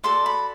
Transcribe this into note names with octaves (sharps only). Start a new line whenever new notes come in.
F#4 A4 D5 C6
B5